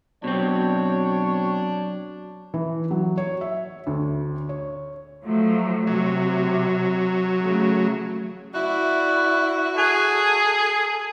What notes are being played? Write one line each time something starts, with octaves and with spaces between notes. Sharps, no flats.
B2 F#3 C4 D4 C#5
E3
F#3
C#5
E5
D2
C#5
F3 F#3 A3
C3 F#3
C#3 A3
E4 F#4 D5
G#4 A4 G#5